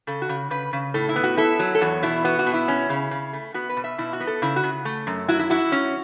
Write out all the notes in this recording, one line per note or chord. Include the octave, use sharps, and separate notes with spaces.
C#3 A4
F#4
C#3
C#3 B4
C#3
A2 A4
E4
B3
F#4
E4 A4
F#3
A4
E2 F#4
B2 E4
B3 F#4
F#4
B2
E4
C#4
C#3
C#3
A3
B3 F#4
B4
B2
E5
B2 E4
F#4
B3
A4
C#3 E4
F#4
C#3
A3
F#2
E4 F#4
E4
E4 F#4
C#4